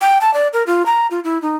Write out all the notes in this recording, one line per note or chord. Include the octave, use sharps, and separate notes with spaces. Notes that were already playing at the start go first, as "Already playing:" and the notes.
G5
A5
D5
A#4
F4
A#5
F4
E4
D#4